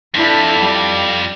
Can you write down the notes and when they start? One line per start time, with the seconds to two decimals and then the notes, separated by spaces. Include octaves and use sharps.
0.15 F2 D4 E4 A4
0.60 G3